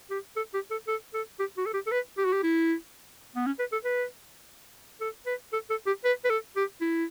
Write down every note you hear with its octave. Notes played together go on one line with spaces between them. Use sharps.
G4
A4
G4
A4
A4
A4
G4
F#4
A4
G4
A4
B4
G4
F#4
G4
E4
B3
C#4
B4
A4
B4
A4
B4
A4
A4
G4
B4
B4
A4
G4
E4